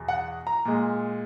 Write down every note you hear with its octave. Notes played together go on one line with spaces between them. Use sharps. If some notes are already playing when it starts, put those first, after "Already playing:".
Already playing: E2 B2
F#5
A#5
A#2 G#3